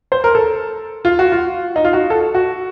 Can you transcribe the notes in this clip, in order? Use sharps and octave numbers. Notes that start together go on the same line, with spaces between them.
C5
A#4
A4
F4
F#4
F4
D#4
F4
F#4
A4
F#4